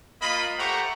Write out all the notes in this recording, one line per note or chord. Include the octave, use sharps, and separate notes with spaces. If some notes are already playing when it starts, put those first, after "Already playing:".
A#3 F4 D#5 B5
A3 G4 C5 F#5 A#5 C#6